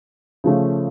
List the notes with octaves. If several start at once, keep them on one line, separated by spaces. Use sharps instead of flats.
C#3 F3 A3 C#4